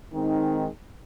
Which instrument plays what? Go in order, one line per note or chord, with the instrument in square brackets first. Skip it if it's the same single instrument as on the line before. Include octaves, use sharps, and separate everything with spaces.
[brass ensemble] D#3 G#3 C4 D#4